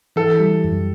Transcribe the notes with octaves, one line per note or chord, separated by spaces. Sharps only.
E3 A4
G3
F#2